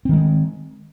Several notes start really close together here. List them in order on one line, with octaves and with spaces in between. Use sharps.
C4 D#3 G#3